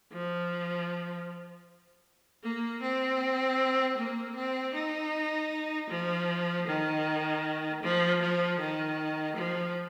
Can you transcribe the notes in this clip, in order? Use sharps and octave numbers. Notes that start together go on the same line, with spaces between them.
F3
A#3
C4
A#3
C4
D#4
F3
D#3
F3
F3
D#3
F3